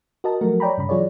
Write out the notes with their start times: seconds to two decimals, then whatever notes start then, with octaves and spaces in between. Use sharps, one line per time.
0.24 F#4 A#4 D#5 A5
0.41 F3 F#3 A3 F#4 A#4
0.60 C#5 D5 G5 A#5 B5
0.78 G2 C#3 B5
0.89 E3 F#3 F4 G#4 C#5 D5